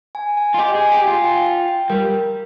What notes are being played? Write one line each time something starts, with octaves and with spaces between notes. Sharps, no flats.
G#5
G#5
F4
G4 D#5
G#4
G#5
G4
G#5
F4
G5
G5
G5
G3 A#4